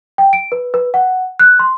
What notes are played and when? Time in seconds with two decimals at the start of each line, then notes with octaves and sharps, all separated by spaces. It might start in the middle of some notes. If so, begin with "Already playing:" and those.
0.18 G5
0.33 D7
0.52 B4
0.74 B4
0.94 F#5
1.39 F#6
1.59 C6